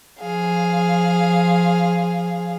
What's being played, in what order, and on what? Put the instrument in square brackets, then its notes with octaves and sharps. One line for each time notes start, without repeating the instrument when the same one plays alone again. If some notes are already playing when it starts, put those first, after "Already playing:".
[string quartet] F3 G#4 F5